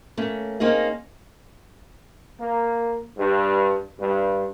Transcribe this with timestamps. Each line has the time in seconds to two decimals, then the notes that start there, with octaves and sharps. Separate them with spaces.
0.17 A3 A#3 C#4
0.60 A#3 C4 C#4 D#4 G#4
2.41 A#3
3.18 G2
4.00 G2